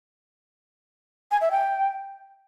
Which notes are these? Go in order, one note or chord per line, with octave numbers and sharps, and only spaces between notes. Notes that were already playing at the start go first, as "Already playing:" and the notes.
G#5
E5
G5